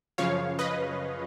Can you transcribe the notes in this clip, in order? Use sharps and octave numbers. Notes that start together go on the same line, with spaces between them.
F#2 C#3 F3 C#5 F5
B4 D#5